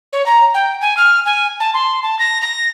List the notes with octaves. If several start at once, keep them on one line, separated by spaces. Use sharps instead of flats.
C#5
A#5
G5
G#5
F6
G#5
A5
C6
A5
A#6
A#6